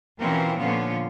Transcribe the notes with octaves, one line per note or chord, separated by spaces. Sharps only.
B2 E3 C4 C#4 F4 A#4
A#2 D3 F3 B3 C#4 F4